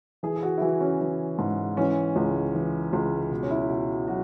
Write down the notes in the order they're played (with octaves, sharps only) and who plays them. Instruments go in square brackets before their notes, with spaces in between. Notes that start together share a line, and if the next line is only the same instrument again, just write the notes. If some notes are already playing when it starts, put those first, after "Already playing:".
[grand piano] E3 G#4
G#4
F#4
E4
E3 F#4
C#4
E3
G#2
E3 C#4
C#2
E3
C#2
B2
C#4
E4
B2 F#4
F#3 F#4